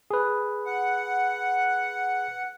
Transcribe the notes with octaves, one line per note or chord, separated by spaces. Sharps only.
G#4 B4
F#5